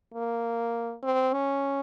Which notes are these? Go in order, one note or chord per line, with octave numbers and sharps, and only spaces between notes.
A#3
C4
C#4